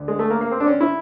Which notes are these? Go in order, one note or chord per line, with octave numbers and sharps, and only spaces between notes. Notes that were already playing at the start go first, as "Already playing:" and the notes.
Already playing: D2 D3
G#3
A3
A#3
A#3
C4
D4
C#4
E4